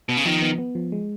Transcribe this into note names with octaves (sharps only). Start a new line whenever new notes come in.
B2 B3
C#3
D#3 F3
B3
B3
F3
G#3